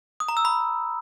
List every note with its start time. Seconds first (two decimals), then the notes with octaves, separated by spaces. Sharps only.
0.20 D#6
0.28 A#5
0.37 E6
0.45 B5